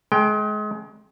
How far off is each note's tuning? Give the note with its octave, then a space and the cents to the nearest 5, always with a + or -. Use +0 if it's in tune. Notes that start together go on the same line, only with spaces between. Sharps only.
G#3 +30 G5 +0